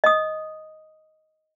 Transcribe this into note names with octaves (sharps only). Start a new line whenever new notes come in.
D#5 D#6